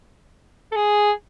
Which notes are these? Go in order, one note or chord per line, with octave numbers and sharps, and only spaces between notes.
A4
G#4